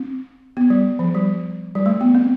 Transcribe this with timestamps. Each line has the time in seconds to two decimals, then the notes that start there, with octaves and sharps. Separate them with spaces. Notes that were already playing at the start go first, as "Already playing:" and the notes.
Already playing: C4
0.57 B3
0.70 G3
0.99 F3
1.14 G3
1.75 G3
1.86 A3
2.01 B3
2.15 C4